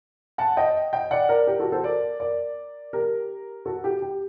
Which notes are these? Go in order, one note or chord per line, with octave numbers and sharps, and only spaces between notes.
F#5 A5
D#5 G5
D#5 G5
D5 F#5
A#4 D5
G4 A#4
F#4 A4
A4 C5
A#4 D5
A#4 D5
G4 A#4
F#4 A4
G4
G4